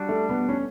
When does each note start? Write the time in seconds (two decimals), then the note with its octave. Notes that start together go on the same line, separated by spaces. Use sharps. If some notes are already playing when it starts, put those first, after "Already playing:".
Already playing: G3 D4 F#4 B4
0.09 A3
0.29 B3
0.49 C#4